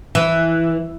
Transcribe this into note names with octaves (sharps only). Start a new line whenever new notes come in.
E3